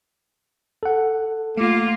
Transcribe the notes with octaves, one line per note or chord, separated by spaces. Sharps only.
A4 F#5
A3 A#3 F4